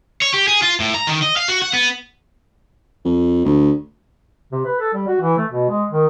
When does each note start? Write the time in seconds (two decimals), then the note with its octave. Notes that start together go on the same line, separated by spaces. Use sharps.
0.22 C#5
0.34 G4
0.48 G#4
0.62 F4
0.80 A2
0.94 A#5
1.07 D#3
1.22 D#5
1.37 F5
1.48 F#4
1.62 F#5
1.73 B3
3.05 F2
3.45 D2
4.52 C3
4.65 B4
4.80 A4
4.94 G3
5.07 F#4
5.21 E3
5.37 A3
5.51 B2
5.69 G#3
5.91 D#3